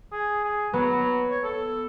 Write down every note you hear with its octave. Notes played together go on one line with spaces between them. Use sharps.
G#4
G#4
F#3 B3
C#5
A4